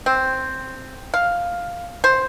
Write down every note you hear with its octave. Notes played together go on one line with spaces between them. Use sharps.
C4
F5
C5